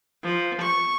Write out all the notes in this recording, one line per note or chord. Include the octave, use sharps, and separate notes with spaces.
F3
C#6